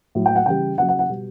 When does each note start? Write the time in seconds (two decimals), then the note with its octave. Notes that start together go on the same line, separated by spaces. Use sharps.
0.15 A2 F#3
0.26 G5
0.36 F#5
0.46 C#3 E3 G3 G5
0.77 C#3 F#5
0.81 F#3
0.88 F#5
0.99 F#5
1.09 B2 G3